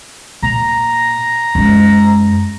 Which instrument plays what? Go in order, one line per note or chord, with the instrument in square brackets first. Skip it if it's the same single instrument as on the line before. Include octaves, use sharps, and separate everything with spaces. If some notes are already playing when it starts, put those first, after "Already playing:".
[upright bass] A#2 [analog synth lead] A#5
[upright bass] F#2 G#3